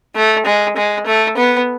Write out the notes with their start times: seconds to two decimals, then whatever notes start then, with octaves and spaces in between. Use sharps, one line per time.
0.16 A3
0.46 G#3
0.77 G#3
1.06 A3
1.37 B3